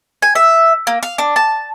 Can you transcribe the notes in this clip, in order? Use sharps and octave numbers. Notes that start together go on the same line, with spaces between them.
G#5
E5
A#3
F5
D4
A5